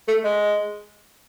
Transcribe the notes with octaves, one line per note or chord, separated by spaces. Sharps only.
A3
G#3